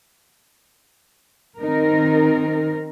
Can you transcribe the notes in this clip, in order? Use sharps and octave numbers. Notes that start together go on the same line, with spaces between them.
D#3 C4 D#4 A#4